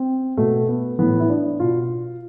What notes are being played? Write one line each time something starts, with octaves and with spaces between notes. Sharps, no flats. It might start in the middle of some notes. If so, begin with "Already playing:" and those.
Already playing: C4
B2 A3
B3
A2 E3 B3
E4
D4
B2 F4